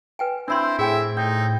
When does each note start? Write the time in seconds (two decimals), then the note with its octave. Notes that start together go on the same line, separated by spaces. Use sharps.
0.19 B4 G5 G#5
0.48 C4 D4 E4 C5 C6
0.79 A2 G#4 E5 G5 G#5
1.17 D#4 A4 G5